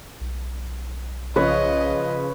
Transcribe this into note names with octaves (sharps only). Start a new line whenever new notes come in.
B1
C#3 F3 B4 C#5 D#5